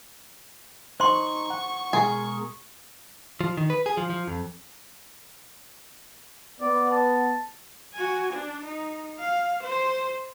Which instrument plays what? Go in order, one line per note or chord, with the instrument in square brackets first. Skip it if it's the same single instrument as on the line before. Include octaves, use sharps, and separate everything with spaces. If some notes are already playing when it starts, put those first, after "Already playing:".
[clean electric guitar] D#4 [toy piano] C5 C6 [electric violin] C#6
[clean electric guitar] F#5
[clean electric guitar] B2 G#3 A#4 [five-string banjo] G#4
[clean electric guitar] F3
D#3
B4
G#4
F3
F3
F2
[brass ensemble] B3 [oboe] D5
[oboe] A5
[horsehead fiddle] F#4 G#5
D4
D#4
F5
C5